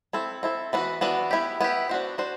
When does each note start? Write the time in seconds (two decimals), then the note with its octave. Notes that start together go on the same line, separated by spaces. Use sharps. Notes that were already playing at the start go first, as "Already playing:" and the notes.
0.13 C4 E4 A4
0.43 C4 E4 A4
0.73 E3 B3 D4 F#4
1.01 E3 B3 D4 F#4
1.31 B3 E4 G4
1.61 B3 E4 G4
1.89 D4 F#4 C5
2.18 D4 F#4 C5